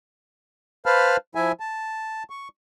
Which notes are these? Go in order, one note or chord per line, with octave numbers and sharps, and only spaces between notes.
B4 C5 F5 A5 B5 F6
F3 E4 E5 G#5
A5
C#6